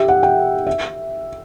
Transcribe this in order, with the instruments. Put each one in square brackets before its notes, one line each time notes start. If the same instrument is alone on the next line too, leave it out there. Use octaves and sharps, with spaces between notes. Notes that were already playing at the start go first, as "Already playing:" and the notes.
Already playing: [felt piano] G4 E5
F#5
G5
E5